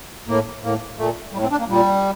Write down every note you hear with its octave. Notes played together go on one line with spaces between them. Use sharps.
A2 A#3
A2 A#3
A#2 A3
A2 G3
C4
D4
A#3
A#2 G3